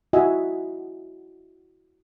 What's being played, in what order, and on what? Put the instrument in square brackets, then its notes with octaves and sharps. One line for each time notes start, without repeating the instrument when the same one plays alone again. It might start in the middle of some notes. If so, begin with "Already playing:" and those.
[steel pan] E4 F#4 D#5 E5 F#5 G#5